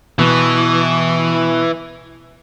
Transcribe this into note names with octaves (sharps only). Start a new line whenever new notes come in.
B2 E3